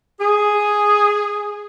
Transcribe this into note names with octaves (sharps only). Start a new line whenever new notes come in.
G#4